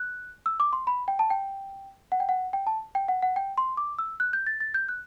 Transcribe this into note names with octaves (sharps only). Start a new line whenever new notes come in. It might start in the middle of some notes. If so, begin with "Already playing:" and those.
Already playing: F#6
E6
D6
C6
B5
G5
A5
G5
F#5
G5
F#5
G5
A5
G5
F#5
F#5
G5
C6
D6
E6
F#6
G6
A6
A6
G6
F#6